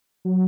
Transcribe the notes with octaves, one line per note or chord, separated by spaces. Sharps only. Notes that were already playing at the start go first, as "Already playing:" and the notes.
F#3